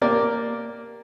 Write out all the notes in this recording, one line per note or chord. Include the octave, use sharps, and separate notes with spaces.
A#3 G4 A#4 D5